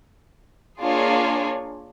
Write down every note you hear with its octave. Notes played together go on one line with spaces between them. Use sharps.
A#3 D4 F4 G#4 C#5